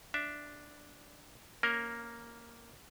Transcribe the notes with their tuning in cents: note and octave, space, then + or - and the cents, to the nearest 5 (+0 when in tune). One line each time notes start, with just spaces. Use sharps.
D4 +0 E5 +5
A#3 +0 C#4 +0 A#4 +0